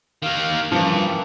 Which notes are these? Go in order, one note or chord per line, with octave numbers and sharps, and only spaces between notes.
D#3 A#3 F5
G2 E3 F3 A#3